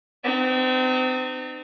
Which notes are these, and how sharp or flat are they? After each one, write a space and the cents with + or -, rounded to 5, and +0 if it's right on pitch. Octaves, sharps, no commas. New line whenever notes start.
C4 -35 D#4 -40